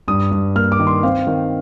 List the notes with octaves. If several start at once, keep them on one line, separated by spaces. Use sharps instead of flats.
G2 D#6
G2
A#3 F6
D6
D#3
C6
C4 F5
D#3